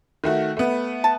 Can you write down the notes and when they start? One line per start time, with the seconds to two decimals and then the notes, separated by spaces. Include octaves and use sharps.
0.24 D#3 A3 F#4
0.57 A3 B3
1.04 A5